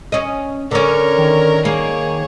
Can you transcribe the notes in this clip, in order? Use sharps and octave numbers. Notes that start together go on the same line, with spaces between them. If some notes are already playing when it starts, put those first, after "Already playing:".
C#4 D#5
D3 C#4 A#4 C#5
D#3
A#3 G#4 C#5